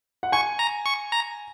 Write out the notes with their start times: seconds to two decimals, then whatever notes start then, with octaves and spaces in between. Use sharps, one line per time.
0.23 F#5
0.32 G#5 C#6
0.59 A#5
0.86 C#6
1.12 A#5